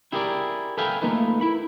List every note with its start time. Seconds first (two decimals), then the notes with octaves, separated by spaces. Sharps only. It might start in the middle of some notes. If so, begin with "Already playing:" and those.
0.12 E4 G4 G#4 A#4 B4 D5
0.77 A4 B4 E5 F5 G5 G#5
1.02 A3 A#3 D#4 F4 B4
1.41 E4 B5